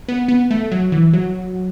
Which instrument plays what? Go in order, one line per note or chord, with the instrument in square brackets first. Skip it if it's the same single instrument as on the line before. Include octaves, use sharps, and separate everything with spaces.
[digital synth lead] B3
B3
A3
F#3
E3
F#3